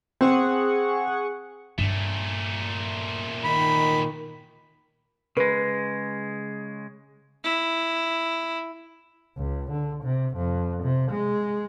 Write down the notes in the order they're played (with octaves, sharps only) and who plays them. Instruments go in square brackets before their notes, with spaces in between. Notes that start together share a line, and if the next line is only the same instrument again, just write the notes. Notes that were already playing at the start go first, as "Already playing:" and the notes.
[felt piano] C4 [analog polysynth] G#4 F#5 C#6
[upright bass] G2 D4 [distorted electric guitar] A#2 A3
[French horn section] D#3 [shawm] B5
[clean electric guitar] C#3 G#3 [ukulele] B4
[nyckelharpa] E4
[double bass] C#2
D3
C3
F2
C3
G#3